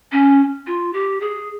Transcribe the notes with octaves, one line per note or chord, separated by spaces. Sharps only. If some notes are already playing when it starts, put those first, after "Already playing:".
C#4
F4
G4
G#4